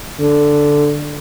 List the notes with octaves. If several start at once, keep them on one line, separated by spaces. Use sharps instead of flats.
D3